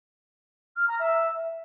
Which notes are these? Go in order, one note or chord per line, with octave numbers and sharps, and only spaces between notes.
F6
A#5
E5